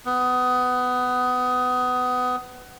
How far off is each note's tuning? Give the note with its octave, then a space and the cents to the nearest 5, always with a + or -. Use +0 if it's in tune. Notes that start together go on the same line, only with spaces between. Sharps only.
B3 +20